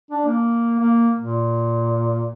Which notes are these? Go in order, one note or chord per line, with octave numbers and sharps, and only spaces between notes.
D4
A#3
A#3
A#2